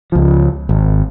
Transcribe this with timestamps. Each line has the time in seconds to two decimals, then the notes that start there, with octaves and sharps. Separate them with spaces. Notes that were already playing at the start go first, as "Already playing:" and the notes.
0.12 C#2 F3
0.69 G#1